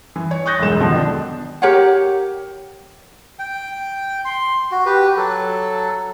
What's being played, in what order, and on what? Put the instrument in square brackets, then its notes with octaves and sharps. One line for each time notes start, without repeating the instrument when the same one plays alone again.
[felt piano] E3
C#5
C#6 D#6 F#6 G6 A6 A#6
E1 B1 G#2 E7
F2 B2 D3 D#3 F3
D4
[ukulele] G4 A#4 C#5 F#5
[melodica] G5
C6
F#4
G4 B4
F#3 A4